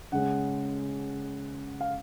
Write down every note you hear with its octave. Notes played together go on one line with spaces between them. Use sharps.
C#3 G#3 C#4 F#5
F5